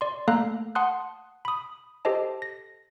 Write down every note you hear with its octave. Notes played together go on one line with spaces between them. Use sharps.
D5 C6
A3 A#3 A4 F5 A#5 F#6
F#5 A5 C6 D#6 F#6
B5 D#6
G4 A4 C5 D#5 A5
A#6